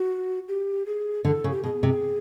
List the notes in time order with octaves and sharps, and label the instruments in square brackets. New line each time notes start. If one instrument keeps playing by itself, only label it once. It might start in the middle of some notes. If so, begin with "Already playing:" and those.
Already playing: [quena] F#4
G4
G#4
[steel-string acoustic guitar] D3 [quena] A4
[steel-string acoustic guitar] C#3
[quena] G4
[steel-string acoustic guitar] B2 [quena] G#4
[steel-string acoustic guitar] C3